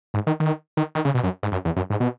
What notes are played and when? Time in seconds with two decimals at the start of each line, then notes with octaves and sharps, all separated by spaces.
0.14 G#2
0.27 D#3
0.40 D#3
0.77 D#3
0.95 D#3
1.05 C#3
1.15 B2
1.24 F#2
1.43 G#2
1.52 F#2
1.65 E2
1.76 F#2
1.90 G#2
2.00 B2